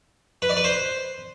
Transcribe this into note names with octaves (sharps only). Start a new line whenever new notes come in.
B4
D5
B4
C5